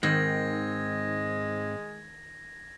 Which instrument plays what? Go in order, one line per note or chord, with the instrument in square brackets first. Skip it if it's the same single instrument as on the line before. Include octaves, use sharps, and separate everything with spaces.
[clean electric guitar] G#2 C4 [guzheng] D#3 [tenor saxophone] G#3 [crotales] G#6 A#6